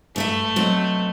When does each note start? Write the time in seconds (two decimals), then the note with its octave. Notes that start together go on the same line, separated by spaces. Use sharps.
0.16 G2 A3 A4 E5
0.56 B2 F#3 C4